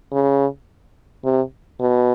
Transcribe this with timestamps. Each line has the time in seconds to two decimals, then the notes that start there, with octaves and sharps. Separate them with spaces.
0.12 C#3
1.24 C3
1.80 B2